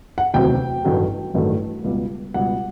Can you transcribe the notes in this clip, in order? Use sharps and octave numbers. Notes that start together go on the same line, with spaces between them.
F#5
E1 D2 C3 D#3 F#3 G5
A1 G2 D#3 F#3 A3
A1 G2 D#3 F#3 A3
C#2 B2 G3 B3
C#2 B2 G3 B3 F#5